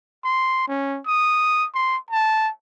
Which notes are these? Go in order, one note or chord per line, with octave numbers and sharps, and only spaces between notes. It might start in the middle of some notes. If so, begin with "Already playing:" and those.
C6
C#4
D#6
C6
A5